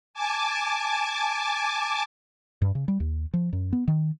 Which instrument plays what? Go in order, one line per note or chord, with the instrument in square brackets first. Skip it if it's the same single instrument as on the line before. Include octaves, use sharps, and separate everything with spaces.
[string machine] G#5 A5 D6
[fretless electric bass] G2
C#3
G3
D#2
F3
F#2
B3
D#3